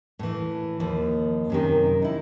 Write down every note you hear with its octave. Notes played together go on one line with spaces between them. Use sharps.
A2 E3
D#2 F3
F#2 C3 D#3
D#4 E4